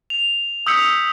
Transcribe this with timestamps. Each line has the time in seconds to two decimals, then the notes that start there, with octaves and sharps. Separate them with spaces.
0.10 F7
0.66 D#6 E6 G6 B6 C#7 F7